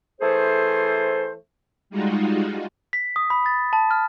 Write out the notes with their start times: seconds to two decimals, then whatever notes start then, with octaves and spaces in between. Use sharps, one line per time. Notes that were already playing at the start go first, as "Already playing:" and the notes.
0.21 E3 A3 G#4 A4 C5
1.90 G3 G#3 D#4 F4 F#4
2.93 B6
3.16 D#6
3.30 B5
3.46 A6
3.73 A5
3.91 F6